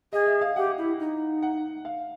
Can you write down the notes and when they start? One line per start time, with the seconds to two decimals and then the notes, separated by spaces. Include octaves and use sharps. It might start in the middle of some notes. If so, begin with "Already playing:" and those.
0.13 G#4 D#5
0.27 E5
0.41 F5
0.56 G4 F#5
0.78 E4
0.99 D#4
1.42 F#5
1.85 F5